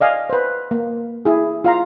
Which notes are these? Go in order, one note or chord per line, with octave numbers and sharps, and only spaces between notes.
D5 D#5 F5 G#5
B4 C5
A#3
E4 G#4
F4 F5 A#5